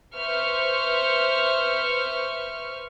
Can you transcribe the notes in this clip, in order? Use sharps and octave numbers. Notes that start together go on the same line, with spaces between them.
B4 C5 E5 C#6 F6